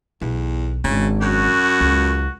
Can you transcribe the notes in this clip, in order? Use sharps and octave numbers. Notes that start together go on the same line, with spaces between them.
B1 E2
G#1 C#3 D4
F#2 F#4
C#2